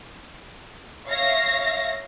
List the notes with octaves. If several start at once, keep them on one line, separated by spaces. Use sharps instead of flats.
C#5 E5 F5 A#6